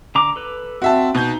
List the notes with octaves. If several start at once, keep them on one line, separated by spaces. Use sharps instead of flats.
D3 A#5 D6
A4 B4
C4 F#4 E5 A5
B2 D#4 G6